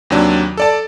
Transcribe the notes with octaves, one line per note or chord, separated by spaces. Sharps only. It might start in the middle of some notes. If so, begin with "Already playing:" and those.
D#2 C3 F#3 D4
A4 D5 A5